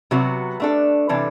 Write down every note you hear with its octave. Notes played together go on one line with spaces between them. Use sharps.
C3 F#3 B3 F#4
A3 D4 A4
C3 E3 G3 D4 A4